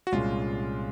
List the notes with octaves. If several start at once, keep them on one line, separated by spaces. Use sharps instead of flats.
F#4
C2 A#2 G#3 C#4 F4